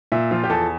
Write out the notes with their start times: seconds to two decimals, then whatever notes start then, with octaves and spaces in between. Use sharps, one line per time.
0.12 A#2 E5
0.31 F3 F4
0.44 G4
0.50 E2 A4